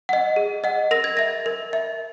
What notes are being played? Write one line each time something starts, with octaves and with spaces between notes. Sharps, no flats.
D#5 F#5
G#4
D#5 F#5
A#4 A#6
G#6
E5 A#6
A#4
E5